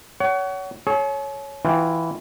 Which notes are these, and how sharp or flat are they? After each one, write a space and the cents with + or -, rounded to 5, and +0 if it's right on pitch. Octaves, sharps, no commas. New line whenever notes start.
C#5 +30 F#5 +30
G#4 +45 C#5 +0
E3 +0 F4 +20 G5 +0